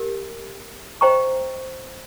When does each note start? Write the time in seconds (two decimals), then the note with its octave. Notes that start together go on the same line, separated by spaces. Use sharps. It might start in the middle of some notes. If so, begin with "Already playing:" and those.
Already playing: G4 A#4
1.01 C5 D#5 G5 A#5 C#6